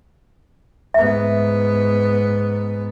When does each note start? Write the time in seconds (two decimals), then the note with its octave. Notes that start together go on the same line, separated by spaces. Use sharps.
0.94 G#2 B3 E5